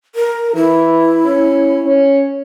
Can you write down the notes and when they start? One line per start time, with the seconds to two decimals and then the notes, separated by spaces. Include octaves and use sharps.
0.15 A#4
0.56 E3 E4
1.25 C#4
1.86 C#4